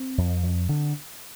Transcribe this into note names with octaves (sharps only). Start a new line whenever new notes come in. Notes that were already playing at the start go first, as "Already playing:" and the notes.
Already playing: C4
F2
F2
D3